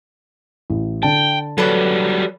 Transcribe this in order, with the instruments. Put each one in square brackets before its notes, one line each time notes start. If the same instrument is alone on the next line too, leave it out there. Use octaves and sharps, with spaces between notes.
[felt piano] A1
[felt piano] D3 A5 [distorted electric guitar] G5
[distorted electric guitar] F#3 G3 [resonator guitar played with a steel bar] A4 B4 D5